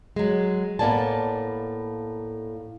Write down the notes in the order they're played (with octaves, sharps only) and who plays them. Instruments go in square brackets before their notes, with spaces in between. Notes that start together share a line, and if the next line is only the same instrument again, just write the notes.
[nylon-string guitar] F#3 G#3
A2 A#3 B3 D5 G#5 A5